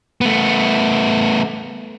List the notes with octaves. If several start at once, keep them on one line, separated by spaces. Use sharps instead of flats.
A3 B3